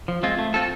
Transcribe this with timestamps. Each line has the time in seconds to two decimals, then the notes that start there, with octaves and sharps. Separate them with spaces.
0.08 F3
0.23 G#3 C4 F4
0.38 A3
0.54 C4 F4 A4